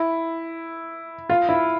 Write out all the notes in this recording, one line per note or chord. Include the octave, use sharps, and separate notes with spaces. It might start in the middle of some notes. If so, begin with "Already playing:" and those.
Already playing: E4
F4
E4